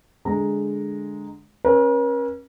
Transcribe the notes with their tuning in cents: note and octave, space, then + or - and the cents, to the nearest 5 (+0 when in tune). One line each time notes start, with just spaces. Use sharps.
D3 +0 G#3 +0 A#5 -5
C#4 -25 A#4 +45